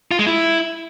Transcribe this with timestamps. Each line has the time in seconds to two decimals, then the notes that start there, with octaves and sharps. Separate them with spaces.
0.11 F4
0.19 G#3
0.27 E4